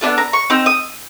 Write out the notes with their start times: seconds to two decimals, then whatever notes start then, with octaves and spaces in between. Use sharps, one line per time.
0.01 B3 D4 F4 A4
0.18 A#5
0.33 C#6
0.50 C4 D#4 E6
0.66 D#6